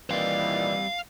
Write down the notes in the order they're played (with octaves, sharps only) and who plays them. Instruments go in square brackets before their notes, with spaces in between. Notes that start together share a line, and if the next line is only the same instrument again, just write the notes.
[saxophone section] A#2 D#3 E3 [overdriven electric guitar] G3 C4 [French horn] D5 [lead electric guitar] F5